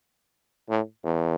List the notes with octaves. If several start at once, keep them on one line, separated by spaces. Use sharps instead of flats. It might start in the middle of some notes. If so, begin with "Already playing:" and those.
A2
E2